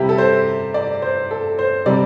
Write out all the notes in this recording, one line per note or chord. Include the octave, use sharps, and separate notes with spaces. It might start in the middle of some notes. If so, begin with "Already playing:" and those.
Already playing: C3 G3 E4 G4
A4
C5
D5
C5
A4
C5
C3 G3 D5